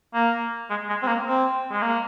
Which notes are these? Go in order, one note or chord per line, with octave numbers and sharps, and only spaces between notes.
A#3
G#3
G#3
C4
A#3
C4
G#3
A#3